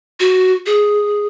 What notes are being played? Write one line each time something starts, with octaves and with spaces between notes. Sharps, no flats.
F#4
G#4